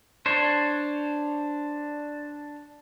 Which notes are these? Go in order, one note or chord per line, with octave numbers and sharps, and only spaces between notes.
D4 C5 C#5